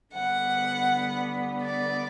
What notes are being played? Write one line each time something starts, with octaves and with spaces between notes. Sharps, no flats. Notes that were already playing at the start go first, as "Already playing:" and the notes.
D3 G3 B3 F#5
D5